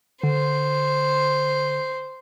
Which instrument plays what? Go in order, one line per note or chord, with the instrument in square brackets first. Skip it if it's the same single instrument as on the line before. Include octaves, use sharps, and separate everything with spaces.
[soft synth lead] D3 [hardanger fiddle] C5